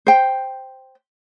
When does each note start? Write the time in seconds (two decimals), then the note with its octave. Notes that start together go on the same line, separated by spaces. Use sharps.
0.07 C5 G5